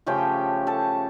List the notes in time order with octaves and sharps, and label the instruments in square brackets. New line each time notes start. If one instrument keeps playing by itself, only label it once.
[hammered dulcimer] C#3 F3 A3 C#4 G4 G5
A4 A5